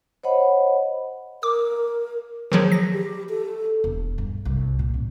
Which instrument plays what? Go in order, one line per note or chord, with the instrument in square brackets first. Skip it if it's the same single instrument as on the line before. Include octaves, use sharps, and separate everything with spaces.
[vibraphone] C5 C#5 D#5 F#5 B5
[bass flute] A#4 [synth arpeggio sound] D6
[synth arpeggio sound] D#3 F3 F#3 [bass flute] G#4
[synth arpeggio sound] A#6
[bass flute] G4
A4
[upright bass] E1
G2
C2
A#2
A1